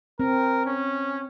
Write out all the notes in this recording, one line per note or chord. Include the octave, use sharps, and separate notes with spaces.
C4 A#4
C#4